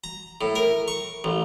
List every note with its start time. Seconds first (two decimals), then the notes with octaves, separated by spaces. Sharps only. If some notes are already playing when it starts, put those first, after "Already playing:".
0.04 A#5
0.41 A2
0.55 A#4
0.88 C#6
1.24 A1